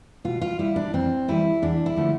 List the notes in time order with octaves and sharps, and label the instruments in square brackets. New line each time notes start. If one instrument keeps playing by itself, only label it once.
[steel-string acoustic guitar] B2 F4
F4
G3 E4
D4
F2 C4
E3 G3 E4
E2 D4
E4
D3 F3 A3